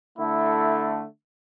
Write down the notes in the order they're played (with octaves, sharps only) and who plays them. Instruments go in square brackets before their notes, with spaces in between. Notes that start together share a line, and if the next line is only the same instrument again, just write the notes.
[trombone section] D3 A3 [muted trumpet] E4